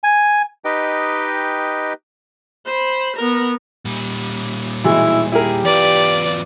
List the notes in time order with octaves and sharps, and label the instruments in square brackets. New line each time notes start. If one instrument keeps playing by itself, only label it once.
[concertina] G#5
D#4 G4 B4 D#5 G5
[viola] C5 B5
B3 A#4
[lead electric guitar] A#2 G3
[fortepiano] B2 E3 G#3 [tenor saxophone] E4
[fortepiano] E4 A#4 [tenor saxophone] G4 [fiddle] G#4
[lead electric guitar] E2 F4 [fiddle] B4 D5